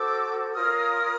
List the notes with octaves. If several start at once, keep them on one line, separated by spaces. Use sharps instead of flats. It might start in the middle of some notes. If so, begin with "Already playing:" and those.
Already playing: F#4 A4 C5 D6 E6
F4 A#4 C#5 D#6 F6